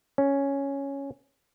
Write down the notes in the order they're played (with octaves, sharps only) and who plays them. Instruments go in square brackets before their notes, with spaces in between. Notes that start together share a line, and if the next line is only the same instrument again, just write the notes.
[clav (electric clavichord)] C#4